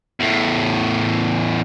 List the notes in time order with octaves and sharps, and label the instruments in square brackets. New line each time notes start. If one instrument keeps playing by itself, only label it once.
[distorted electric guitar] E2 A2